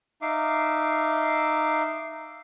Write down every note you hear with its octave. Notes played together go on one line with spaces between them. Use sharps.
D#4 E5 F5 D6